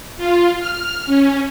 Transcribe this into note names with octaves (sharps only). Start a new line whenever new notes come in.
F4
F6
C#4